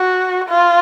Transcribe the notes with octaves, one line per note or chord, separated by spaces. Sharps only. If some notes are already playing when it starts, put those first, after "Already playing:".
Already playing: F#4
F4